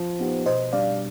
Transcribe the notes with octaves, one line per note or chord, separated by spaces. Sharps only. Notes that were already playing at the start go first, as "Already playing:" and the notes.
Already playing: F3 C5
B3 D#4 G4
B2 C5 D#5
G3 D4 D5 F5